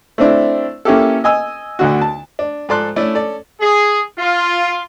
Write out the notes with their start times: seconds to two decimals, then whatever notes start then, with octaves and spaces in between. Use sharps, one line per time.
0.18 A3 C4 D4 E4
0.85 A#3 C#4 E4 G4 A4
1.24 D#5 G#5 E6
1.79 D2 D3 F#4
2.01 A5
2.39 D4
2.69 G#2 F3 A4 D5 C6 F#6
2.96 A3 C#4 D4 E4
3.15 C#4 A4 D5
3.61 G#4
4.18 F4